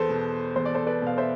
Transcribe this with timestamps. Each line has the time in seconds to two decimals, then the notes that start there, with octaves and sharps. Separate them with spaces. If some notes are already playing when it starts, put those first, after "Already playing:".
Already playing: E2 A4 B4 C5
0.09 B2
0.56 E2 C5
0.65 D5
0.74 A4 C5
0.86 B4 D5
1.02 B2 F5
1.18 C5 E5